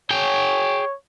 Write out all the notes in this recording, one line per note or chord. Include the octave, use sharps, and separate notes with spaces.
G#4 C#5 G5